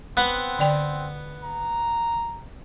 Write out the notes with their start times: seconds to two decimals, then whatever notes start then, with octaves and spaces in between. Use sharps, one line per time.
0.17 B3 C4 F#5
0.59 D3 D5 G5
1.44 A#5